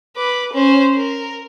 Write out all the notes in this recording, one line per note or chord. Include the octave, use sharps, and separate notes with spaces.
B4 D6
C#4 C5
A#4